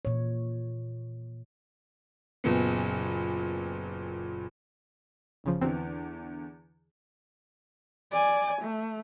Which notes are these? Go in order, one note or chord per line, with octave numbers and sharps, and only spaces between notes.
A#2 E3 C#5
F#1 A#2 B3
G1 C#3 F3
E2 D3 E3 C4
D5 G#5
A3